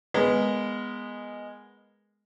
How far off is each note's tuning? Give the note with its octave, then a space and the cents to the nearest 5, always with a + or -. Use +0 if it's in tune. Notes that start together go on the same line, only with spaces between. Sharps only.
G#3 -5 B3 +0 A#4 +0